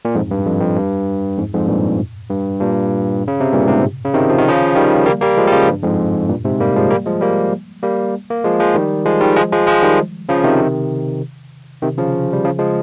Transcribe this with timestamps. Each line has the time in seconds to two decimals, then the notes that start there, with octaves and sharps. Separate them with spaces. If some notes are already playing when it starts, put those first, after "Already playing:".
0.05 A#2
0.15 F2 G#2
0.31 G2
0.46 F2
0.61 F2
0.77 G2
1.37 F2 G#2
1.53 F2 G#2
1.68 G2 A#2
2.30 G2
2.60 G2 A#2
3.28 C#3
3.40 C3
3.52 G2 A#2
3.68 G#2 C3
4.05 C#3
4.14 C3 D#3
4.30 F3
4.39 D#3
4.48 C#3 F3
4.75 D#3 G3
5.06 G3 A#3
5.21 G3 A#3
5.38 F3 G#3
5.47 G3
5.52 C#3 F3
5.68 G2
5.83 F2 G#2
6.29 G2 A#2
6.45 G#2 C3
6.60 G3 A#3
6.76 F3 G#3
6.90 G3 A#3
7.06 F3 G#3
7.21 G3 A#3
7.83 G3 A#3
8.30 A#3
8.44 F3 G#3
8.60 F3 G#3
8.75 D#3 G3
9.05 F3 G#3
9.21 D#3 G3
9.36 F3 G#3
9.52 F3 G#3
9.67 F3 G#3
9.82 D#3 G3
10.29 C#3 F3
10.44 C3 D#3
11.82 C3 D#3
11.98 C#3 F3
12.33 G3
12.44 C#3 F3
12.59 F3 G#3